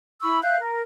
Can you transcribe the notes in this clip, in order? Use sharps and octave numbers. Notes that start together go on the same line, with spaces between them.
E4 B5 C#6 E6
E5 F5 F#6 G6
A#4